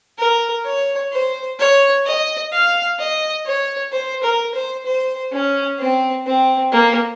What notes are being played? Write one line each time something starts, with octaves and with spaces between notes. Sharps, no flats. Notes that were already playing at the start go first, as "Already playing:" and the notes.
A#4
C#5
C5
C#5
D#5
F5
D#5
C#5
C5
A#4
C5
C5
C#4
C4
C4
A#3